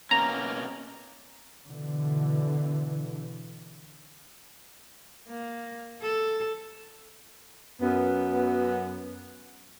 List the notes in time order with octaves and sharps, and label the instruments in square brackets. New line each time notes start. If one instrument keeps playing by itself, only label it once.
[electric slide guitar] B2 A#3 C#4 [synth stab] A#5
[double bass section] B2 D3 E3
[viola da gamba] A#3
A4
[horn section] F#2 B3